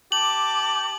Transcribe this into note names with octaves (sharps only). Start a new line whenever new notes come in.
G4 A5 D6 F#7